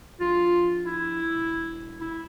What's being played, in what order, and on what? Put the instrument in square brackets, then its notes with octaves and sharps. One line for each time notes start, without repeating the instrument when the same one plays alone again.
[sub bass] A#1 [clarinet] F4
[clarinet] E4
[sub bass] E1
[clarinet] E4